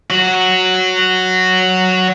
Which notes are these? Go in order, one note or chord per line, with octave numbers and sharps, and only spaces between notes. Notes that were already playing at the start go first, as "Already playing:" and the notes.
F#3 F#4